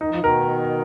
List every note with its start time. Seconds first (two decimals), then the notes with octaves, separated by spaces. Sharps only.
0.01 D#3 D#4
0.10 F3
0.20 B2 D#3 A#4